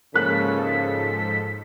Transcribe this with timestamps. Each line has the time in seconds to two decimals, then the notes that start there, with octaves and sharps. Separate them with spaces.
0.14 G#2 C#3 F3 A#3 A4 F#6 B6